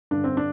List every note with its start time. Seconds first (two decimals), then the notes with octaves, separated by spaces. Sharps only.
0.11 G2 D3 D4
0.24 C4
0.37 D4